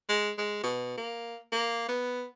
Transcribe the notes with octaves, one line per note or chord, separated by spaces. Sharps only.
G#3
G#3
B2
A#3
A#3
B3